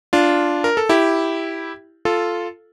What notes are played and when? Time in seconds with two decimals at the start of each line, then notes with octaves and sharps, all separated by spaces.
0.13 D4 F4
0.64 A#4
0.77 A4
0.89 E4 G4
2.05 F4 A4